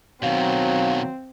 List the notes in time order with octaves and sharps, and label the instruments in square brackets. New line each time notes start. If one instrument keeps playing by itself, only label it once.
[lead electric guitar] B2 D#3 [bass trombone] F#3 [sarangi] C4 [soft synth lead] F5